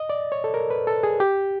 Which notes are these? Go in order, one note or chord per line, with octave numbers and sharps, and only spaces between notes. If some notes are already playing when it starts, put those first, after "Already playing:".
Already playing: D#5
D5
C#5
A4
A#4
B4
A4
G#4
G4